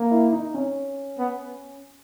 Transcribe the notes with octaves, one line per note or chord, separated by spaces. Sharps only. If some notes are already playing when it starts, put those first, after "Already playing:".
Already playing: A#3
E4
D#4
C#4
B3